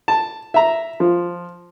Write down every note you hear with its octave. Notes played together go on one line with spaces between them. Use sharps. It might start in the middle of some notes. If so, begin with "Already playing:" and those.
A5
E5 A#5
F3